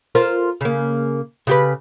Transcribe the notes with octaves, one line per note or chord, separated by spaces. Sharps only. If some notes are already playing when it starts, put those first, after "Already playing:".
F4 A#4 C5
C#3 A#3
C#3 G4 B4